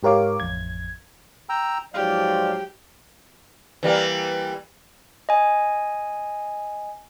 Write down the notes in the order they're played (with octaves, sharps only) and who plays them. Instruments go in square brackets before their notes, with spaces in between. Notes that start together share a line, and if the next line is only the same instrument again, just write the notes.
[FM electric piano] G#2 G4 A#4 C#5 F5 D6
A1 F2 G#6
[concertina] G5 A#5 E6
[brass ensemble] G#2 F3 F#3 [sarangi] G4 [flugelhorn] D5 [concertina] F5
[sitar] E3 G3 A#3
[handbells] D#5 G#5